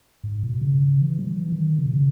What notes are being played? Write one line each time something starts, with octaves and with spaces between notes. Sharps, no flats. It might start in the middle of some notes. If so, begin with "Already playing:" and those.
G#2
B2
C#3
C#3
E3
F#3
E3
D#3
C#3
B2
C#3